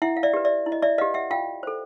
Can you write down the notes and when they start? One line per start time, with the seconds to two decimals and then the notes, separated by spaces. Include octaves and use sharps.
0.02 E4 E5 F#5
0.17 F5
0.23 D5 E5
0.34 G4 B4
0.45 D5 E5
0.66 E4
0.72 D#5
0.82 D5 E5
0.98 G4 B4 D#5 F5
1.14 E5 F#5
1.31 F4 F5 G5
1.63 A4 C5